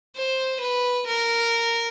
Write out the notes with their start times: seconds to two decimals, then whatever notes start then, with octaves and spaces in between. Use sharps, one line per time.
0.16 C5
0.61 B4
1.08 A#4